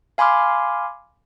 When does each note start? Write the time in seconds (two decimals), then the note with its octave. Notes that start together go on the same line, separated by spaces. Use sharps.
0.18 F5 G#5 B5 C6 D6 F6